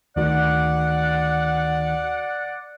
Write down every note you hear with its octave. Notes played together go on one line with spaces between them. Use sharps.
D2 D#3 F#4 D5 F#5